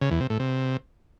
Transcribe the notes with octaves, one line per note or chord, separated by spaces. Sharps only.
C#3
E2
C3
A2
C3